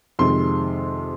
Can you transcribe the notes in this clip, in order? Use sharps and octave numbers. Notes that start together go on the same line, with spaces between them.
F2 C3 D#3 G#3 C6